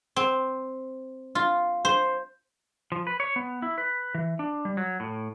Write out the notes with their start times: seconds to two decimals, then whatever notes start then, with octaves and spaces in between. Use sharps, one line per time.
0.16 C4
1.35 F4
1.85 C5
2.92 F3
3.07 B4
3.20 C#5
3.36 B3
3.62 E4
3.78 B4
4.15 E3
4.39 D4
4.65 G3
4.77 F#3
5.00 A2